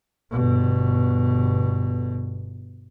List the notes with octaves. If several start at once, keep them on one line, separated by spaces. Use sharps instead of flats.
G1 B2